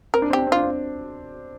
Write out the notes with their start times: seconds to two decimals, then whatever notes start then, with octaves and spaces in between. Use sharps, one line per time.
0.14 C4 A#4
0.22 D4
0.30 C4 G4
0.39 D4
0.47 C4
0.52 D4 F4
0.63 C4